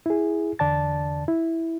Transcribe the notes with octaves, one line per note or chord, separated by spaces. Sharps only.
E4 G#4
E2 D3 D5 A5 A6
E4